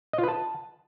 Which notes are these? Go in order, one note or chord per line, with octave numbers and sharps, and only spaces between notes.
D#5
F4
B4
A5